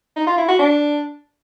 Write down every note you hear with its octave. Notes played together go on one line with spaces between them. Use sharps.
D#4
F4
E4
F#4
D4